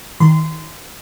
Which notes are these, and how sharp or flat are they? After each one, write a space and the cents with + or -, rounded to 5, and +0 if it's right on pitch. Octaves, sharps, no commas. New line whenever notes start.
D#3 +30 C6 -25